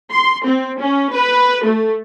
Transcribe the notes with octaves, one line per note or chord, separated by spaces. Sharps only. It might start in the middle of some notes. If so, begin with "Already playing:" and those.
C6
C4
C#4
B4
A3